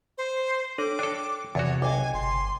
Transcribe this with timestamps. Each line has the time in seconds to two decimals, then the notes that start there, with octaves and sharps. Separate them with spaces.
0.18 C5
0.78 D4 A4 C#5 D6
0.99 D4 A4 G5
1.55 E2 C3 F#4 C#5 A6
1.82 B1 D#5 G5 G#5 D6
2.14 G1 C6